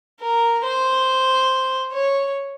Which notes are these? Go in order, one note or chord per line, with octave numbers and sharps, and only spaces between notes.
A#4
C5
C#5